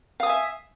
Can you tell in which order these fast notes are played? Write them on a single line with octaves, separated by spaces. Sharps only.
F5 D#6 G#5 E5